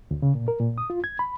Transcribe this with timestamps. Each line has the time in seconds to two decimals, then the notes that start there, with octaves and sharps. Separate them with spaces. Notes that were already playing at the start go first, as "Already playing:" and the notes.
0.11 D2
0.22 C#3
0.35 A#2
0.48 A#4
0.60 A#2
0.78 D#6
0.90 F4
1.04 G#6
1.19 B5